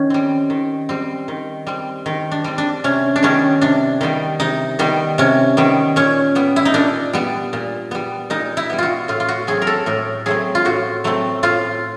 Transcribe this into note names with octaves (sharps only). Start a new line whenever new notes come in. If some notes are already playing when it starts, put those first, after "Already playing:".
Already playing: D#3 C#4
G3 C4
D#3
G3 C4
D#3
G3 C4
D#3
D4
G3 C4
D4
C3 C#4
D4
D#3 G3 B3 C#4
C3 D4
D#3 G3 B3
C3 D#4
D#3 G3 B3
C3 C#4
D#3 G3 B3
A#2 C#4
G3 B3
E4
D#4
A#2 D4
G3 B3
A#2
G3 B3
A#2 D#4
E4
G3 B3
F4 F#4
A2 F4
F4
F#4
F#3 A3 C4 G#4
A#4
A4
A2 A#4
F#3 A3 C4 G#4
F4
A2 F#4
F#3 A3 C4
A2 F4